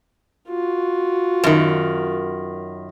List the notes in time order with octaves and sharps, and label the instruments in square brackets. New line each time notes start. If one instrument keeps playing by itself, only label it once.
[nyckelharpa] F4 F#4
[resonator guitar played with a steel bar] F#2 D#3